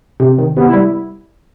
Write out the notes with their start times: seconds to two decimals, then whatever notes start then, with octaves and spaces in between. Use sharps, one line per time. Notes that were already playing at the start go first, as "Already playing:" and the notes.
0.20 C3
0.38 D#3
0.56 C3 B3
0.68 E4
0.73 G3